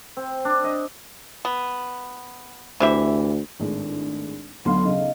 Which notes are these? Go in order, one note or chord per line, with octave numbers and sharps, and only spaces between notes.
C4
D4
D#5
B3
D2 C3 E3 E5
G#1 A2 G#3 D4
D2 F#3 B3 D#4 F5 C6
B1 C#3 D#5 F5